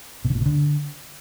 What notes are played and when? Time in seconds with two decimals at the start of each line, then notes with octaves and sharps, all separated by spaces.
0.25 B2
0.30 D3
0.35 A#2
0.40 B2
0.46 D3